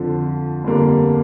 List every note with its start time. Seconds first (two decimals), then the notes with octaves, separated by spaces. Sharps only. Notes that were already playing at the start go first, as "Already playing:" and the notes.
Already playing: F2 D3 F3
0.64 G1 F2 D3 G3 A#3